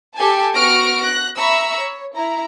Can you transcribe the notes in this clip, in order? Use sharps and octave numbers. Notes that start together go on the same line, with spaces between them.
G4 A4 G#5 A5
B3 F#4 C#6 F6 A#6 D7
F#6 A#6
E5 A#5 B5 C#6 E6
C#5
E4 A#5